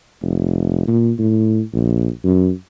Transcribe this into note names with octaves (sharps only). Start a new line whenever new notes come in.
F1
A#2
A2
A#1
F#2